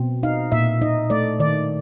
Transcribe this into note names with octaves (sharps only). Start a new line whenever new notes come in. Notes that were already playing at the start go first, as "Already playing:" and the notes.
Already playing: B2 C4
D#4 F5
A#2 E5
D#4 D#5
A3 D5
D#3 D5